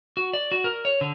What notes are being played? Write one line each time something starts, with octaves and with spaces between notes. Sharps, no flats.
F#4
D5
F#4
A#4
C#5
D3